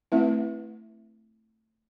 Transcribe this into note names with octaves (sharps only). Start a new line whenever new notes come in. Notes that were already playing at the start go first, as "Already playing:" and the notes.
A3 C4 E4 B4 E5